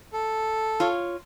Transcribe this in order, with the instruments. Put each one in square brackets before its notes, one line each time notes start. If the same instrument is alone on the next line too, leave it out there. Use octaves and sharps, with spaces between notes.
[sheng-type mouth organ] A4
[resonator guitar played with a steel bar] F4 C#5